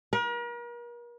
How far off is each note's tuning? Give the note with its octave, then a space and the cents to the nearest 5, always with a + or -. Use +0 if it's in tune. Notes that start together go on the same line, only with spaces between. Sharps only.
A#4 +40